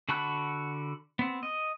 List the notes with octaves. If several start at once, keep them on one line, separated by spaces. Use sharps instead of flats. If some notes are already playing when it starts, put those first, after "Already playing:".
D3 F#4 A5 B5 F#6
B3 C4
D#5